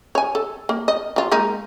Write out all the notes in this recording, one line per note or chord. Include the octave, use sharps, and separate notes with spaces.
C#5 G#5
A4
A#3
D#5
F#3 F4
G#3 A#3 D#4